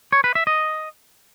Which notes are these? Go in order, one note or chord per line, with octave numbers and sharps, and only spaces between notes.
C#5
B4
E5
D#5